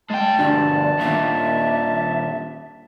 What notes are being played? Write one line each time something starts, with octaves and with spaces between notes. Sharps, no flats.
G#3 G5 A5
D2 G2 D4 D5
D#2 A#2 E5